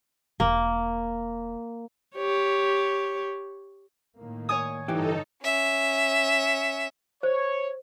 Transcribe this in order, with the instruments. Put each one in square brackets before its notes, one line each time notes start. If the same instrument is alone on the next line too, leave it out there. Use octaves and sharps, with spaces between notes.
[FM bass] E1 [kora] A#3
[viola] G4 C#5
[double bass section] A2 D#3 A#3
[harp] C#5 G#5 D#6
[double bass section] G2 D3 [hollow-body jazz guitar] E3 G4 [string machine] D#4 A4
[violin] C#4 E5
[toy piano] C5 [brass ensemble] C#5